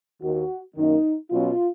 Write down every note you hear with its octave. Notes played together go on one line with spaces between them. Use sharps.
D#2 D#3 A#3 F#4
F#2 D#3 A#3 D#4
B2 F#3 C#4 F4